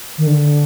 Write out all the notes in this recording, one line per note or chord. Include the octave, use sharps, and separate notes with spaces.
D#3
D3